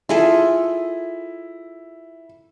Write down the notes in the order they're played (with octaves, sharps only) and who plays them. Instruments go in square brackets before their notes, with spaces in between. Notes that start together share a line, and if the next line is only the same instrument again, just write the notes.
[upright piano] E4 [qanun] F4 G#4 A4